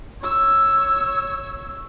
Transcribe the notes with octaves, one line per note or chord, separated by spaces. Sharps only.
C#5 E6